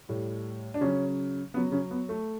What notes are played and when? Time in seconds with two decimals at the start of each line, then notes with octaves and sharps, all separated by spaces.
0.09 A2 G3
0.74 D4
0.81 C#3 F#3 C#4
1.54 C#3 B3
1.57 F#3
1.72 C#3 C#4
1.91 B3
2.09 A3